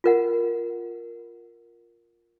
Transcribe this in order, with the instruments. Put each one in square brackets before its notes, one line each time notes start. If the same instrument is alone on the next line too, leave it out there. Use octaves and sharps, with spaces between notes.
[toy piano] F4 A#4 F#5